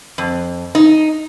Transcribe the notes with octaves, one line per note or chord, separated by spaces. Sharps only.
F2
D#4